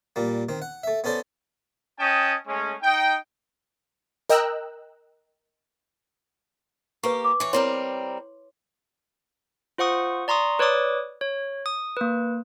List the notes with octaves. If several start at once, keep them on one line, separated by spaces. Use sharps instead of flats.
A#2 G3 A#3
D#3 C4
F#5
A3 E5
B3 C#4 A4 C5 D5
C#4 D#5 G5 A5 D#6
G#3 A3 C#4
D#4 G5
A#4 D#5 G5 A#5 E6 F#6
A#3 G4 B4 C#6
D6
E3 C#5
G3 C4 E4 A#4 C#5 C6
F4 C5 F#5 C#6 D#6
D5 A#5 C6 C#6 D#6
B4 C#5 D5 D6 D#6
C#5
D#6
A#3 B4